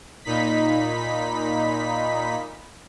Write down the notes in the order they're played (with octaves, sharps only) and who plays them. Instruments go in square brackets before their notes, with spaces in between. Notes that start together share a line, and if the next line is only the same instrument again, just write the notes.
[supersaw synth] A#2 D#4 B5 B6